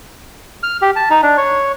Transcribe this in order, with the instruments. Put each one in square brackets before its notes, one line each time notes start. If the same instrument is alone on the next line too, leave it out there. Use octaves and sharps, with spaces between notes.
[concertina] F6
G4
A5
D#4
D4
C#5